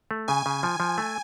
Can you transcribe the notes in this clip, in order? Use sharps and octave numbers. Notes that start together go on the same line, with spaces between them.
A3
C#3 G#5
C#3
F3
F3
A3